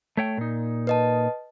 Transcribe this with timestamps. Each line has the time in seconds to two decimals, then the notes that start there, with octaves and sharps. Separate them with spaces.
0.17 A3 C#5 G5
0.38 A#2 D#4
0.87 B4 D#5 A5